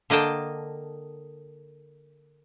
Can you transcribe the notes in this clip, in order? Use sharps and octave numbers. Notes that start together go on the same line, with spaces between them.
D3 A#3 D#5 G5 A5